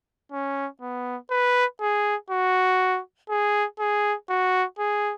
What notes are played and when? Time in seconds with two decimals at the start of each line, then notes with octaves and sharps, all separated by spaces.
0.32 C#4
0.82 B3
1.31 B4
1.81 G#4
2.30 F#4
3.30 G#4
3.80 G#4
4.29 F#4
4.79 G#4